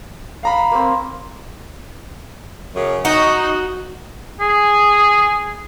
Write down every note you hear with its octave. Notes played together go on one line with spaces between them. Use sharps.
F5 A#5 B5
A#3 C4
F#2 C#3
D#4 F#4
G#4